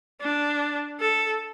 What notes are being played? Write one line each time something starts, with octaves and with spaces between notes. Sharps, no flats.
D4
A4